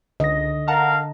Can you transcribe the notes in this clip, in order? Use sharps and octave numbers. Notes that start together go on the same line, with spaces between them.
C#2 D3 D#5 A#6
A#4 F5 F#5 A5 A#5